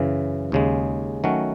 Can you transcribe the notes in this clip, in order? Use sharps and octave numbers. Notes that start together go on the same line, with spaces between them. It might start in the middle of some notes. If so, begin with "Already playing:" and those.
Already playing: F#2 C#3 E3
D#2 C#3 G#3
D#3 F#3 A3 C#4 F#4